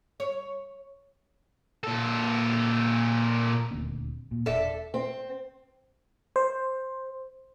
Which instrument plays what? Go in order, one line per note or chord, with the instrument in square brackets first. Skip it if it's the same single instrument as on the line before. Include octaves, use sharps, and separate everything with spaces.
[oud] C#5
[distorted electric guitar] A#2 A4
[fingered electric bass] D#1 D2 C4
A#2
[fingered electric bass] E1 [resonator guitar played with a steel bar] A4 D5 E5
[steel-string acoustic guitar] C4
[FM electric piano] C5